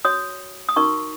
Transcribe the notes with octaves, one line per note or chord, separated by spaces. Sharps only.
F#4 C#5 D#6
D#6
D#4 F#4 A#4 C#6